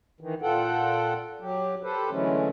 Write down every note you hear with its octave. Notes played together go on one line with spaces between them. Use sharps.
D#3 E3
A#2 F4 A4 F#5 G5
F#3 G4
G4 A4 B4 C5
D3 E3 F#3 G#3 A3 C#4